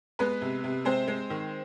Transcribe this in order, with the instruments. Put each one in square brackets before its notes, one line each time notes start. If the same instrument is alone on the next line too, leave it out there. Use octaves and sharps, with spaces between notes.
[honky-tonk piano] G#3 B3 B4
C3
C3
G#3 C4 C5
G#3
D#3